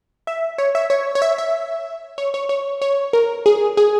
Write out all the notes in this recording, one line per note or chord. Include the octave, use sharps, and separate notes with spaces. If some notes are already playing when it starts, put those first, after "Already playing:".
E5
C#5
E5
C#5
C#5
E5
E5
C#5
C#5
C#5
C#5
A#4
G#4
G#4